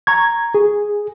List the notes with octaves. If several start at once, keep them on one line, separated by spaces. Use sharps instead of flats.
A#5 C#6 G#6
G#4